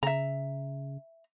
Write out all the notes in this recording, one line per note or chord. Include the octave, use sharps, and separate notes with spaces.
C#3 E5 A#5